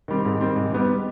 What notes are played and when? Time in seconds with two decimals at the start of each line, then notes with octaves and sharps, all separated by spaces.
0.08 D#3 G3 C4
0.25 G#2
0.41 D#3 G3 C4
0.56 G#2
0.72 G3 B3 D#4